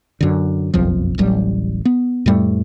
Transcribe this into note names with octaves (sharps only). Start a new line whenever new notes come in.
F#2 D3
F#1 B1 F2 F3
D1 A1 F#3 G3
B3
F2 A2 G3 A3